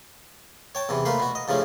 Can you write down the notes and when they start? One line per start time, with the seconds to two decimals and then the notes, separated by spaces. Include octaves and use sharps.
0.75 C#5 G5 A5
0.89 E2 C3 E3
1.05 A3 A#3 B4 C5
1.20 B2 F#4
1.35 D#5
1.48 G2 C#3 F3 A3 C#4